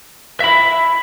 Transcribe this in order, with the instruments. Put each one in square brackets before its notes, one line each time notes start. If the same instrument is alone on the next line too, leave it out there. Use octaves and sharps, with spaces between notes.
[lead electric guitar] E5 B5